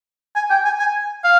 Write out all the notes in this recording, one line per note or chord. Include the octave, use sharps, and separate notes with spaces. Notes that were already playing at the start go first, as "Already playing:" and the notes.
G#5
G5
G#5
G#5
F5